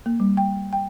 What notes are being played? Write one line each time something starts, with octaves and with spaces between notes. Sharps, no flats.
A#3
G3
G5
G5